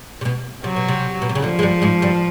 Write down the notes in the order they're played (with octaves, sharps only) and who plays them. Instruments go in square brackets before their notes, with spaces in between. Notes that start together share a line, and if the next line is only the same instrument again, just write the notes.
[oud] C3
B2
[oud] C3 [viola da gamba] F#3
[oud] B2
C3
B2
C3
C#3
[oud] D2 D3 [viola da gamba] F3
[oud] G#3
G2 G3
G#2 G#3
G2 G3